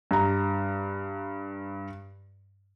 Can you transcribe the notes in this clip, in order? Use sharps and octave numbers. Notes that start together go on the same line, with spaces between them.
G2 A#5